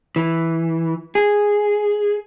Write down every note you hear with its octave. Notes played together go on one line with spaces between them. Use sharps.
E3
G#4